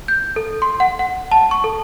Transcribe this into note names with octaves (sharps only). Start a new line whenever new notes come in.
G6
A4
C6
F#5
F#5
A5
C#6
A4